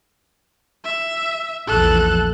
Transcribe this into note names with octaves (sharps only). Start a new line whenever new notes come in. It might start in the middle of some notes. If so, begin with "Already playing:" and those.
E5
A#1 E2 F3 A4 F#6